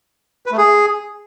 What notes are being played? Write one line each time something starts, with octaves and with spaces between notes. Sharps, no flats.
B4
A3
G#4